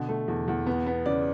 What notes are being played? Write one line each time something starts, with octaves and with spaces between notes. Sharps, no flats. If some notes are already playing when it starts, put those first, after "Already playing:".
Already playing: B2 D3
A3
E2
E2
B3
B3
C#3 D5